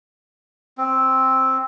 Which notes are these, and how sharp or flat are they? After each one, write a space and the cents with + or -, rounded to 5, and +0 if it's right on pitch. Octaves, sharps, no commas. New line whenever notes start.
C4 +5